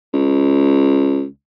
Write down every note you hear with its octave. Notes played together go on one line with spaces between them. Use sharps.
C#2